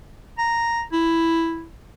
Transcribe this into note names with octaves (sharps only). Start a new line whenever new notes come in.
A#5
E4